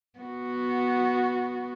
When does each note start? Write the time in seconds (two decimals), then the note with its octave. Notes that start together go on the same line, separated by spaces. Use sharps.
0.19 B3 F#4